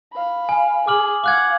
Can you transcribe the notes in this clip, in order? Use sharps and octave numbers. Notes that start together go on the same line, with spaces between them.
F5 B5
G#5
G#4 D6 F6 F#7
F5 F#5 D6 F#6 G#6